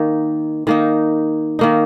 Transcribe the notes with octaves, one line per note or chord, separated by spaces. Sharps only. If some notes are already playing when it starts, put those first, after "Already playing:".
Already playing: D#3 A#3 D#4
D#3 A#3 D#4
D#3 A#3 D#4